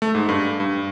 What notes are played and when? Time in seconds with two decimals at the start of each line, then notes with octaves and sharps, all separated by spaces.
0.02 A3
0.15 G#2
0.29 G2
0.60 G2